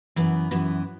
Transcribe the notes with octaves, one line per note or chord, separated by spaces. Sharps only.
F#2 E3 B3 B4
F#2 E3 B3